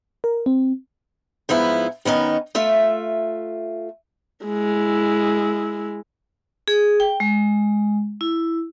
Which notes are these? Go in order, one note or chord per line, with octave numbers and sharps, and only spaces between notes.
A#4
C4
G#2 F3 B3 E4
D#3 B3 C#4 D#4
A3 F4 E5
G#3 E4
G#4
G5
G#3
E4